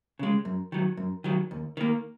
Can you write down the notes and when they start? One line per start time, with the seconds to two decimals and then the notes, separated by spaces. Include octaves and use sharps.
0.19 C#3 G#3
0.45 F#2
0.72 D#3 F#3
0.97 F#2
1.24 D#3 F#3
1.51 D#2
1.77 D#3 A#3